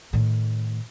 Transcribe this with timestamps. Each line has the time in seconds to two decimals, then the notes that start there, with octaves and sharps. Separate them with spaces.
0.13 A2 D#3